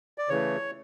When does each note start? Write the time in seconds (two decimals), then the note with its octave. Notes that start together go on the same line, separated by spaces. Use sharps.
0.18 D5
0.29 C#3 E3 A3 C#5